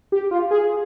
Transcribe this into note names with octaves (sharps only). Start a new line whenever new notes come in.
G4
F4
G#4